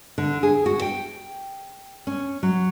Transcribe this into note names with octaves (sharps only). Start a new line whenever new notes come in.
D3
G#4
F#4
G5
C#4
F#3